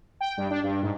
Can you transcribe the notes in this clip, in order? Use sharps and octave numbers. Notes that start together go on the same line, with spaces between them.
G5
G2
D4
G2
G#2